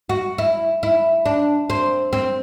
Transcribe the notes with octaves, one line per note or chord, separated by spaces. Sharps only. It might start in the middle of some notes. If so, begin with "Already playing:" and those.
F#4
E4
E4
D4
C4
C4